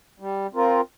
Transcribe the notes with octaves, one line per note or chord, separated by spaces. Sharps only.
G3
C4 F4 A#4